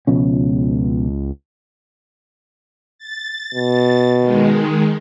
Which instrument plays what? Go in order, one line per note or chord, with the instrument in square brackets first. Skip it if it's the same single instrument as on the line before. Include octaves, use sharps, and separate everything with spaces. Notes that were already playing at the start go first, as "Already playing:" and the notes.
[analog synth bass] C#2 [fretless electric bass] B2 F3 C#4
[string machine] A6
[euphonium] B2
[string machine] D#3 G#3